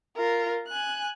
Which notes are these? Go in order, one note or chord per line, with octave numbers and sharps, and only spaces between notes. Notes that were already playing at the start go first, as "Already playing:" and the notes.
F4 A#4
G#5 F#6